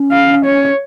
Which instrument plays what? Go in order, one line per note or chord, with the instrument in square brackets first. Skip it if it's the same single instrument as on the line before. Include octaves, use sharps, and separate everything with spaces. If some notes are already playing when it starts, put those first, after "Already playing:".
Already playing: [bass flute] C#4
[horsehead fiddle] F5
C#5